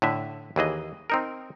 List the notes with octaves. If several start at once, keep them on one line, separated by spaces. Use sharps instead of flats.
A2 D3 E5
D#2 E3 G#4 D#5
C4 D#4 A#4